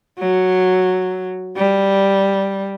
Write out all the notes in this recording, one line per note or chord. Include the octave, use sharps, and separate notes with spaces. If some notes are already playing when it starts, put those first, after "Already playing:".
F#3
G3